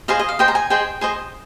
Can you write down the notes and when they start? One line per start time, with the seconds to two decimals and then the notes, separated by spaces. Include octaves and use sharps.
0.08 G#4 C5 D#5 F5
0.19 D#5
0.29 F5
0.39 G#4 C5 D#5 G5
0.48 A#5
0.55 G#5
0.70 G#4 C5 D#5 G5
1.01 G#4 C5 D#5